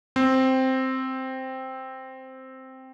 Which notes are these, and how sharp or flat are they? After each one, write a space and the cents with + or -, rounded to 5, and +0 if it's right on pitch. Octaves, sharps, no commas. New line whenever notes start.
C4 +0 C5 +0